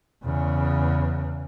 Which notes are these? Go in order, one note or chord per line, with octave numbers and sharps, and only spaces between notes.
E2 C#3